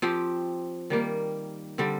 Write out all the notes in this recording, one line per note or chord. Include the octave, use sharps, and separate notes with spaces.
F3 C4 G4
D#3 G3 A#3
D3 G3 C4